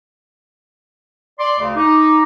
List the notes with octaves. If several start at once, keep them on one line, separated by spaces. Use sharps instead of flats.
D5 C6
D2 C#3
D#4 D6